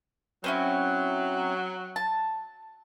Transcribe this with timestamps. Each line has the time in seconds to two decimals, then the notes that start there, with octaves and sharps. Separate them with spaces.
0.44 F#3 C4 C#4 E4
1.96 A5